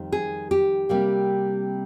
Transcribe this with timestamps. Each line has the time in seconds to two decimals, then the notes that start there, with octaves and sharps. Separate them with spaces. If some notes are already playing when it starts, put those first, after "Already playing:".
Already playing: F2 D#3 G3
0.12 G#4
0.51 G4
0.89 C3 G3 A#3